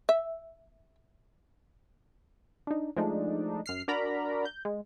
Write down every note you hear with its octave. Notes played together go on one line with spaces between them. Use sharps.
E5
D4 D#4
F3 G#3 A3 D4 D#4
F#2 F6 C7
D4 F#4 A#4 D5 A#5 B5
G6
G#3